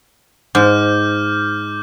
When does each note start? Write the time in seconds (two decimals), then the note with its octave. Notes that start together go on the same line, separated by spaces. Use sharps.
0.55 G#2 D6 F6 G6